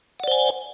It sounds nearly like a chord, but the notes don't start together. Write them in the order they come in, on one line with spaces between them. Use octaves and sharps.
F#5 D5 C5 G#5